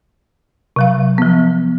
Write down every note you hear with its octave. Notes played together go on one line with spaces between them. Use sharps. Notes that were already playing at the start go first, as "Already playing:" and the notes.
C3 F#3 F5
F3 B3